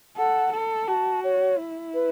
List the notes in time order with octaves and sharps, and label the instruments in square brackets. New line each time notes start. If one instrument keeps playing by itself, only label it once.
[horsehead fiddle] A4 [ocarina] F#5
[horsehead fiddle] A4
[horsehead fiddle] F#4 [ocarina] A5
[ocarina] C#5
[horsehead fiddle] E4
[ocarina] B4